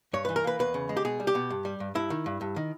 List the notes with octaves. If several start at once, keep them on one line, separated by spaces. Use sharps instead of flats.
G2 C#5
E3 B4
A#4
A#3 B4
E2 B4
C#3
G#3
G4
B2 G#4
G3
G4
B2
G2
G3
G2
G2 E4
D#3
G2
G2
D#3